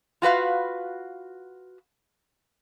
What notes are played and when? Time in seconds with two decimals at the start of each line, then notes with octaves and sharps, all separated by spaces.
0.22 F4 F#4 B4 F5